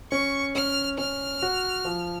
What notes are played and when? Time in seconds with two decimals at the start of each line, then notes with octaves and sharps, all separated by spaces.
0.11 C#4 C#6
0.55 C#4 F6
0.98 C#4 F6
1.42 F#4
1.85 F3